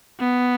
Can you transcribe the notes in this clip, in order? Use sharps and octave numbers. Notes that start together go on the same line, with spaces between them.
B3